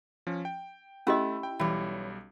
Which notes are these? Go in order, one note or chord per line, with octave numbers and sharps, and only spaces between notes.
F3 C#4
G5
A3 C#4 E4 G4 D#5
G5
B1 E3 G3 C#5